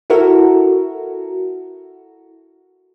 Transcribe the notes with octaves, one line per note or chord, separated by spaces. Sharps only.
E4 F#4 A4 A#4